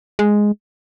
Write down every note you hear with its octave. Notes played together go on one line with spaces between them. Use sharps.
G#3